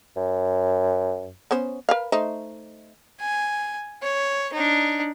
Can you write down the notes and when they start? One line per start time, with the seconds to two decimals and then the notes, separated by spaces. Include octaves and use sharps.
0.17 F#2
1.51 B3 C#4 C5
1.89 A#4 B4 F5
2.12 A3 D#4 C5
3.20 G#5
4.02 C#5
4.54 D4 D#4